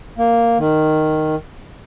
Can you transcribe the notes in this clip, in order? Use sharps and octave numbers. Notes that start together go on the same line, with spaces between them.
A#3
D#3